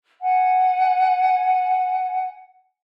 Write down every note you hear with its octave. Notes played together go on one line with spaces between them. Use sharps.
F#5 G#5